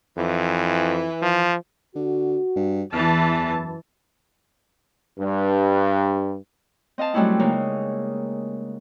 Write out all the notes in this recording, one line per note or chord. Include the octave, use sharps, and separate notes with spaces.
F2 E3
F3
D3 F#4
G2
E2 E3 A5
F#2 B4
G2
C4 D#5 F5 A5
F#3 G3 A3 C4 C#4 E4
C#3 G#3 A#3 D#4